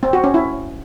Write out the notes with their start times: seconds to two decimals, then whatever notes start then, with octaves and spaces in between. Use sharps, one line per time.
0.03 C4
0.13 F#4
0.24 C#4
0.34 E4